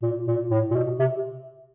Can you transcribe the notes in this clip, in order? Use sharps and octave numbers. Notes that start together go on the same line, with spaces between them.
A#2
A#2
A2
A#2
B2
C3